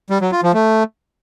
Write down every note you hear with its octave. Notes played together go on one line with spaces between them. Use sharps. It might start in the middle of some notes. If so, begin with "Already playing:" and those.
G3
F#3
F4
F3
A3